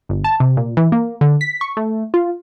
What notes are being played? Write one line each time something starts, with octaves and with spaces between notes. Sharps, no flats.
G1
A5
C3
A#2
E3
A#3
D3
B6
C#6
A3
F4